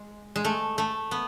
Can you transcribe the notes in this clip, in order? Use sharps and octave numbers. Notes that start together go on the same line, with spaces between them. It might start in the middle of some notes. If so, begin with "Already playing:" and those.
Already playing: G#3
G#3
A3
A3
B3